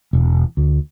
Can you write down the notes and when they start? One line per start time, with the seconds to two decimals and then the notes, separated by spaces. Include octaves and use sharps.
0.13 E1
0.57 D2